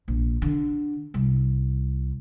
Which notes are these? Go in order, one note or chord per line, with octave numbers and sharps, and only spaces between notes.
A#1
D3
C2